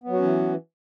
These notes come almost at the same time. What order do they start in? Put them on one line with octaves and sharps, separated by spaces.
B3 F#3 F#4 C#4 E3